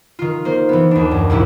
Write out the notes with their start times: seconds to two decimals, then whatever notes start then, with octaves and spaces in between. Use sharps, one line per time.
0.19 D#3 F4
0.45 A#3 C5
0.69 E3 B3
0.91 D#2 D4
1.11 F#2
1.30 C2 F2 G#2 E4